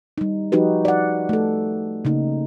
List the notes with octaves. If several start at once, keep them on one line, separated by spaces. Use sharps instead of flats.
G3 D#4
F3 D#4 F#4 G4 B4
D5 F#5
A3 A4
C#3 A#3 D#4